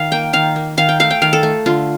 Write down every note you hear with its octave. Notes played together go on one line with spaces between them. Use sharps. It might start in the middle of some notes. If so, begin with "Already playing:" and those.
Already playing: D#3 F5
A#3 G5
D#3 F5
A#3
D#3 F5
G5
A3 F5
G5
D#3 F5
A4
A3
D3 F4